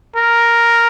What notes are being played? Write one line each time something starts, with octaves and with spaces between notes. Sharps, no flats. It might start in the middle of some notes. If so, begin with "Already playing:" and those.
A#4